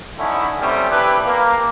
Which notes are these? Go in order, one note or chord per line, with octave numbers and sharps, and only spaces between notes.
D3 C#4 D#4 E4
C3 D#3 G3 A3 C4 C#4
D4 E4 G4 B4
A#3